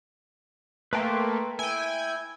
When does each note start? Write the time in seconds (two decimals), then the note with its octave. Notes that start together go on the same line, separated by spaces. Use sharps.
0.93 A3 A#3 B4 G5 C6
1.59 E4 G5 G#5